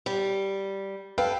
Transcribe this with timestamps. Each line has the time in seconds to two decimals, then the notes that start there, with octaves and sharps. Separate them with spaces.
0.06 G3
1.18 A4 B4 F5 G5